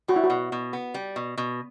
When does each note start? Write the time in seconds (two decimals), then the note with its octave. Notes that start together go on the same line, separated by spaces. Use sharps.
0.08 G3 F#4
0.16 E4
0.24 F#4
0.30 B2
0.52 B2
0.73 B3
0.94 G3
1.16 B2
1.38 B2